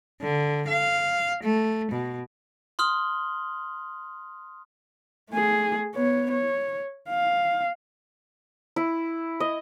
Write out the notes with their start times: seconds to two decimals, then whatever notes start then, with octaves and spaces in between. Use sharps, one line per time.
0.22 D3
0.68 F5
1.44 A3
1.92 B2
2.79 C6 D#6 F6 F#7 G7
5.31 A3 G#4
5.95 B3 C#5
6.31 C#5
7.09 F5
8.76 E4
9.40 D#5